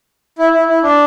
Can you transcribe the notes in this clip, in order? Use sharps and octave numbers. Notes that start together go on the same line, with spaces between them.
E4
E4
E4
D4